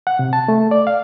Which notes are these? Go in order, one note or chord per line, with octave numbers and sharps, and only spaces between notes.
F#5
C3
A5
A3
D5
F5